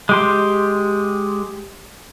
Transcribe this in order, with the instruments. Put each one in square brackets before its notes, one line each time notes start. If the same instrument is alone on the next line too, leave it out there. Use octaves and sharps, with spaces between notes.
[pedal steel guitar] G#3 G4 C6